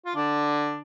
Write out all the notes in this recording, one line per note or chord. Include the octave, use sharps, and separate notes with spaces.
F4
D3 D4